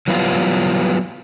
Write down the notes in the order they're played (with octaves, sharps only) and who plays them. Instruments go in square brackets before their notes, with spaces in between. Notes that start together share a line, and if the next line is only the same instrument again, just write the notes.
[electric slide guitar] E3 F#3 G3 B3 F4